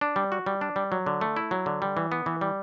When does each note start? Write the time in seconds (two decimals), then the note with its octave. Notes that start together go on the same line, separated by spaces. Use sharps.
0.01 D4
0.16 G3
0.32 F#4
0.46 G3
0.61 D4
0.76 G3
0.92 F#3
1.06 D3
1.21 A3
1.36 E4
1.51 F#3
1.66 D3
1.82 G3
1.97 E3
2.12 B3
2.26 E3
2.41 G3